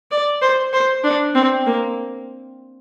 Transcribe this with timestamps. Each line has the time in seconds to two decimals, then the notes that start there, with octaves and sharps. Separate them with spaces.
0.11 D5
0.42 C5
0.73 C5
1.04 D4
1.35 C4
1.66 A#3